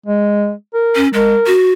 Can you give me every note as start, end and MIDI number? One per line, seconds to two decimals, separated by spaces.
0.06 0.53 56
0.74 1.02 70
0.96 1.08 61
1.14 1.34 56
1.14 1.52 70
1.47 1.73 66